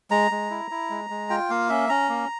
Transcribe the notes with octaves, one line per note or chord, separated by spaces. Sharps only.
G#3 A#5
G#3
E4
E4
G#3
G#3
F4 G5
A#3 F5
C#4 E5
C#4 A#5
A#3